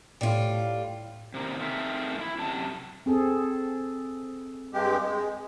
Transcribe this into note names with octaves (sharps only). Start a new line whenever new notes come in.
A2 G3 F4
C3 D#3 A#3
A3 C4 D#4 G#4 A#4 E5
A2 E4
F#2 C3 A5
C4 G#4 A4
G2 G#3 G4
G#3